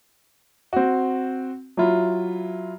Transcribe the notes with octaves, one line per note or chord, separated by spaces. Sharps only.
C4 F#4
F#3 E4 F4